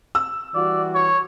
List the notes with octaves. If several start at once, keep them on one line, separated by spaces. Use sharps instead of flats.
E6
E3 G3 F#4 D5
C#5